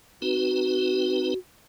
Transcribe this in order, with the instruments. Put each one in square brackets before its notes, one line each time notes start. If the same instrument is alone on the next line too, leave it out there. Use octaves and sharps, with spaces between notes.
[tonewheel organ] C4 D#4 B4 [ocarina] F#4